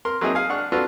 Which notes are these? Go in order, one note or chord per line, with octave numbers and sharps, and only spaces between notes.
A#4 C6
F#3 A#3 C4 D#4 E4 G#4
G#4 F5 G#5
D4 F#5 C#6 F6
D4 F4 F#4 A4 B4